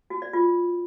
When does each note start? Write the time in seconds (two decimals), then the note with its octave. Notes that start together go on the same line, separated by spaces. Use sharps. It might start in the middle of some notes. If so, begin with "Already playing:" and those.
0.10 F#4
0.22 D5
0.33 F4